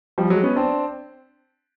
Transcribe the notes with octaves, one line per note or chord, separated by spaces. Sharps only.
F3 G3
F#3 G#3
B3 C#4
C4 D4